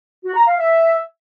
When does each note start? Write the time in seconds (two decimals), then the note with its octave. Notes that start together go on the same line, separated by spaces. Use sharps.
0.25 F#4
0.36 A#5
0.48 F5
0.59 E5